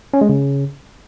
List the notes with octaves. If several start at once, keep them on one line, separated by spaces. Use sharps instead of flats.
C#4
G#3
C#3